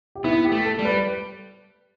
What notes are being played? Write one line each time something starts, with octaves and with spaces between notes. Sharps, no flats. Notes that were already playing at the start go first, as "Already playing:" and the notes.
G4
B3 E4
G4
A3
A4
G3
B4